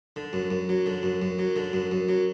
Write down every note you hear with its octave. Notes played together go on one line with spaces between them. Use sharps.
D3
F#2
F#2
F#3
D3
F#2
F#2
F#3
D3
F#2
F#2
F#3